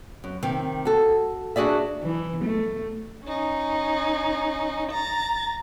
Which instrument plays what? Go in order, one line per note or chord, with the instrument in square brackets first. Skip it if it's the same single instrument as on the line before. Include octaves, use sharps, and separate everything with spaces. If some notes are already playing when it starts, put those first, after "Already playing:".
[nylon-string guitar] F#2
C3 D#3 C4
F#4 A4
D4 F#4 G#4 D5 E5
[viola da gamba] E3
A3
[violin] C#4 D#4
A#5 A6